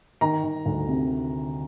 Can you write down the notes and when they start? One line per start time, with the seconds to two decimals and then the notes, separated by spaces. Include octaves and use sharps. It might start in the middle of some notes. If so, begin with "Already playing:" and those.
0.21 D#3 A#5
0.44 D#3
0.66 D2
0.88 C3